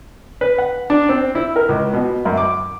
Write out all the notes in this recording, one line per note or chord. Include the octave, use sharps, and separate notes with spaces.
B4
F#5
D4
C4
E4
A#4
C#2
B2
F#2
D6